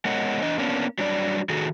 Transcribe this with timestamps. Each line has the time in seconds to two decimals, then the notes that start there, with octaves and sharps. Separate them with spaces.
0.05 G#3 B3 A#4 C#5 D#5 F#5
0.42 E2 D4 D#5
0.58 A#3 B3 C#4 D4
0.99 F#3 G3 D4 D5
1.49 D#3 F#4 G#4 A4